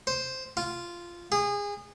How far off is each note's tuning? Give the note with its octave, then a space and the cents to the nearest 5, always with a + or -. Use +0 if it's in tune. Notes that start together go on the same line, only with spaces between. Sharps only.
C5 +0
F4 -10
G#4 -25